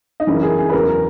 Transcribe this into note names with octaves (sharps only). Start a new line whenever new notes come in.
D#4
F#2 C#3 E3 C#4
A#4
G#4
G#4
B4
E2 C#3 F#3 A#4
A#4